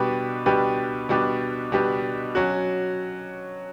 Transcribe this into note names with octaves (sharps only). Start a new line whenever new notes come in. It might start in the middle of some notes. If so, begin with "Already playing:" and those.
Already playing: B2 G3 D4 G4 B4
B2 G3 D4 G4 B4
B2 G3 D4 G4 B4
B2 G3 D4 G4 B4
F#3 C#4 F#4